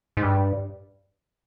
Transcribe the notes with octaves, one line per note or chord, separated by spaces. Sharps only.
G#2
G2